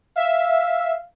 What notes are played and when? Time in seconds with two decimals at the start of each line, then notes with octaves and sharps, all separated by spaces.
0.16 E5 F5